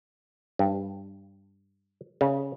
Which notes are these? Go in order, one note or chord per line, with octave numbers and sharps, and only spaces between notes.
G2
C#3